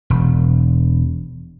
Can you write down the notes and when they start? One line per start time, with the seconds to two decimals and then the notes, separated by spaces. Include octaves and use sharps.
0.10 E1